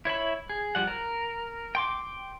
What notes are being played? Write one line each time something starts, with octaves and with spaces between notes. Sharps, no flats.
E4 C#5 E5 B5
G#4
F3 G3 F#5
A#4
G5 C6 D6